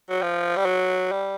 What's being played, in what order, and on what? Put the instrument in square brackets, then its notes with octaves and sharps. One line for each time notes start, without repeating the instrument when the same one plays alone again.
[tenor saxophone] F#3
F3
G3
F#3
G3